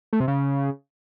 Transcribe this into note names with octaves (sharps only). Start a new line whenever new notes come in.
A3
C3
C#3